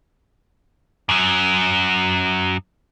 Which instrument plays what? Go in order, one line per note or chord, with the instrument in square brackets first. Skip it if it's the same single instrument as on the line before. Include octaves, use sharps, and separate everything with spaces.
[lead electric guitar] F#2 F#3